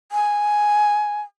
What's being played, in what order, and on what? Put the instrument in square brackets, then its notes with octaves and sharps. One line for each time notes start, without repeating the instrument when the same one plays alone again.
[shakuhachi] G#5